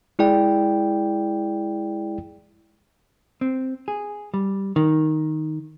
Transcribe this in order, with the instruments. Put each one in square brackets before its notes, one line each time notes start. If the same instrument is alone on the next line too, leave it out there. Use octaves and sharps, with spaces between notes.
[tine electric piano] G#3 E4 G#4 D5 G5
[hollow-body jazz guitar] C4
G#4
G3
D#3